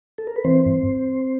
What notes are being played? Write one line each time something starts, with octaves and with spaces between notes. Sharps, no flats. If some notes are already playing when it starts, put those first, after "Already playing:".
A4
A#4
B4
E3 C4 C5
G2